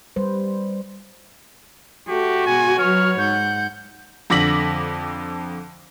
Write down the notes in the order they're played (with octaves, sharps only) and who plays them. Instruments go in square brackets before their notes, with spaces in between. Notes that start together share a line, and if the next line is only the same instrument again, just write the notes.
[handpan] G3 B4 C5
[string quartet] A3 [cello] F#4 [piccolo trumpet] G4
[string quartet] B2 G#3 [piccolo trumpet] G#5
[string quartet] F#3 B4 [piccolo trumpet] C#5 [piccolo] F6
[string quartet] G#2 F#5 [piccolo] G6
[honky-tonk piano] F2 D3 D6 A#6 B6 F#7